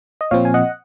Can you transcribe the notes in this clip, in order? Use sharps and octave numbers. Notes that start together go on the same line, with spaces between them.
D#5
A#2 F3 C4 C#5 F5
G#5
D#5 F#5